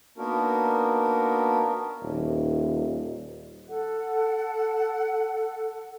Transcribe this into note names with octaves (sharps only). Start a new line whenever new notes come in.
A#3 B3 D4 D#4 F#4 A#4
D#1
A4 F#5